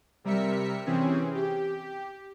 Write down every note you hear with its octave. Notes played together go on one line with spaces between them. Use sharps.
C3 G3 A#4 E5 B6 C#7
C3 E3 C4 C#4 G#4
G4